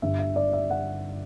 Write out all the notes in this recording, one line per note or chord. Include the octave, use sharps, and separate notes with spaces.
G1 G2 D3 E5
E5
D5
E5
F#5